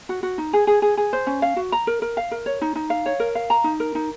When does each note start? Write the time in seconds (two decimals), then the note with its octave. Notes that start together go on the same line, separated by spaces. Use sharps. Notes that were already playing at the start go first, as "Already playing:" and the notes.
0.09 F#4
0.23 F#4
0.38 D#4
0.53 G#4
0.67 G#4
0.82 G#4
0.97 G#4
1.13 C5
1.27 C#4
1.42 F5
1.56 F#4
1.72 A#5
1.87 A#4
2.02 A#4
2.17 F5
2.31 A#4
2.46 C#5
2.61 D#4
2.75 D#4
2.90 F5
3.06 C#5
3.20 A#4
3.35 F5
3.50 A#5
3.64 D#4
3.80 A#4
3.95 D#4